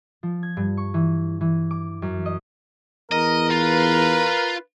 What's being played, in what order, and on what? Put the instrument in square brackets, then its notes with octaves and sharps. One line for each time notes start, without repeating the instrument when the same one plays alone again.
[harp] F3
G#6
G2
C#6
E3
E3
D6
F#2
D#5
[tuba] E2 [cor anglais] A#4 [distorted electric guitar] D#5
[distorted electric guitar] F4 [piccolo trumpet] B4